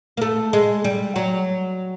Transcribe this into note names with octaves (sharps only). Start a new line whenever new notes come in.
A#3
A3
G#3
G3
F#3